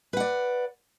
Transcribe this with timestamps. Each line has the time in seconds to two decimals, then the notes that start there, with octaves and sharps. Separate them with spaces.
0.13 B4
0.17 F#5
0.20 D5